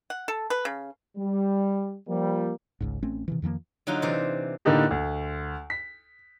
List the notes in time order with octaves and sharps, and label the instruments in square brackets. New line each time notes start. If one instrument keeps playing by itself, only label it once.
[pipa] F#5
A4
B4
C#3
[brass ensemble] G3
F3 G3 A#3
[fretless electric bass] G#1 C#2 G#2
A1 A3 C4 C#4
C3 D#3 E3
F2 D#3 F3 A#3
[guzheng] D3 F#3 D#4 F4
C3 E3 C5 D5
[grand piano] A2 D3 A#3 D4 D#4 G4
D2
B6